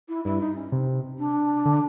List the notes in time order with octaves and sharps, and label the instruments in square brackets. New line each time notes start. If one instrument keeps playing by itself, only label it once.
[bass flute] E4
[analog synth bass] G2 [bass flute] E4
[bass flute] D#4
C#4
[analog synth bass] C3
[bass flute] D4
[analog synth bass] D3